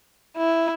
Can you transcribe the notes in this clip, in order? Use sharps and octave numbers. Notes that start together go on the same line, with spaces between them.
E4